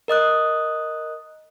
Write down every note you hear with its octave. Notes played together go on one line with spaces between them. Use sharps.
A#4 D#5 D#6 F#6